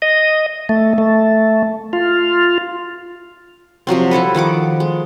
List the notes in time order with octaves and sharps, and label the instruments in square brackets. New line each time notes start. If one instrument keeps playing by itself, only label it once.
[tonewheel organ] D#5
A3
A3
F4
[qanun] C3 F3 F#3 C4
G3 E4 A4 B4
D#3 F3 F#5 D6
G#3